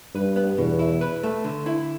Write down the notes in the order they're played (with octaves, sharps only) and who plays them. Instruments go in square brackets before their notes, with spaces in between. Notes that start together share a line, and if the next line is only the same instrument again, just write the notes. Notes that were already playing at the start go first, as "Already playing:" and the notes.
[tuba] G2 [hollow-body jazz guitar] B4
[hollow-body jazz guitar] B3
[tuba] E2 [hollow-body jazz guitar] B2
[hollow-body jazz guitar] E4
B4
A3
D3
E4